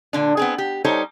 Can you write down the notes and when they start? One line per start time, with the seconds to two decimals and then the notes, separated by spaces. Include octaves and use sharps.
0.13 A#2 D3 D4
0.37 B3 C4 G#4
0.58 G4
0.84 G3 D#4 A4 C5 C#5